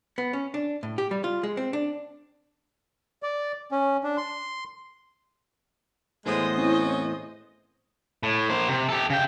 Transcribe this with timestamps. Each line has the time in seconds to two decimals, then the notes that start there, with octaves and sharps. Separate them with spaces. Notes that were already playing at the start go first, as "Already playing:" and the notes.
0.18 B3
0.33 C#4
0.54 D4
0.83 A2
0.98 G4
1.11 G3
1.24 F4
1.43 G#3
1.57 C4
1.73 D4
3.23 D5
3.72 C#4
4.04 D4
4.18 C6
6.26 E2 A2 G#3 B3 C5 D#5
6.58 C4 C#4 E4
8.23 A2
8.49 A#3 C5
8.68 C3
8.89 G4 A4
9.10 C#3 G5